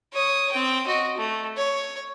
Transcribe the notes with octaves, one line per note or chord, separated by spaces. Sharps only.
C#5 D#6
C4 G5
F#4 D#5
A3
C#5